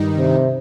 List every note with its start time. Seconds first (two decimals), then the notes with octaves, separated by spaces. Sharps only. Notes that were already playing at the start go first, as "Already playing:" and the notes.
Already playing: G2 D#3 G3 D#4
0.18 C3